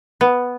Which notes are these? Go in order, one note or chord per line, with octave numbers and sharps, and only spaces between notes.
B3